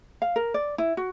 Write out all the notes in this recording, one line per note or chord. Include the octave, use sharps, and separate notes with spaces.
F5
A#4
D5
E4
F#4